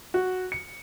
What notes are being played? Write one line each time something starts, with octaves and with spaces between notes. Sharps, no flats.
F#4
C#7